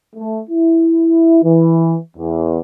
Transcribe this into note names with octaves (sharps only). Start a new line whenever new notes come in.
A3
E4
E3
E2